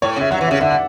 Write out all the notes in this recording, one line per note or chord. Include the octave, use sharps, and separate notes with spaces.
A2 C#5
C#3 E5
F#3 F#5
E3
C#3 E5
D3 E5
F#5